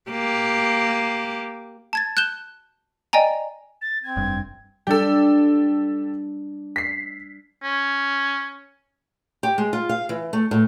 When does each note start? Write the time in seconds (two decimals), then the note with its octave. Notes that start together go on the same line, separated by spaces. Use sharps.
0.10 A#3 G4
1.93 A5 G#6 A6
2.17 F#6 G6 E7 G7
3.13 D5 D#5 G5 G#5 A#5
3.81 A6
4.03 C4 G#6
4.17 F1 G2
4.87 G3 D4 G4 A4
6.76 B6 C7
7.63 C#4
9.43 G4
9.58 G#3
9.73 F4
9.89 F5
10.09 E3
10.33 A3
10.51 A2